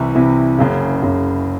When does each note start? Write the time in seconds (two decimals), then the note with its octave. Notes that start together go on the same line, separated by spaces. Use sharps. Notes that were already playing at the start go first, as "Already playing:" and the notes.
Already playing: C2 C3 E3
0.15 C2 C3 E3
0.59 F#1 F#2 C#3
1.02 F#1 F#2 C#3